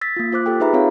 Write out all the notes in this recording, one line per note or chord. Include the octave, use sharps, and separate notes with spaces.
E6 A6 B6
A#3 F4
F4 C5 D6 F#6
G4 A4 G5
D#4 G#4 B4 E5 A#5 B5
C4 F4 C#5 E5 F5